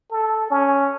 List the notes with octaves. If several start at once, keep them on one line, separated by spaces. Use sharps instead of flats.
A4
C#4